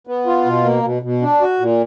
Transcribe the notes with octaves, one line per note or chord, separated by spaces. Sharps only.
B3
F4
B2
A#3
B2
B2
D4
F#4
A#2